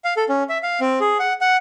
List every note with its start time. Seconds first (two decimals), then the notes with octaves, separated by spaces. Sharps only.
0.04 F5
0.17 A4
0.29 C#4
0.49 E5
0.63 F5
0.80 C4
1.00 G#4
1.19 F#5
1.41 F#5